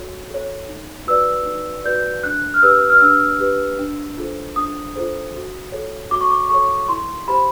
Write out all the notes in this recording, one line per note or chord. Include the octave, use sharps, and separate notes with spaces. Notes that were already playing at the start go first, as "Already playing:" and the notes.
Already playing: F#4 A4 C#5
A4 C#5
D#4
F#4 B4 D5 E6
D#4
F#4 B4 D5 G6
D4 F#6
F6
G4 B4 E6
F6
D4 E6
G4 B4
D4
F4 A4 C5
D4 D#6
F4 A4 C5
F#4
A4 C#5
F#4 D6
C#6
D6
A4 C#5 C#6
E4 C6
G4 C5 B5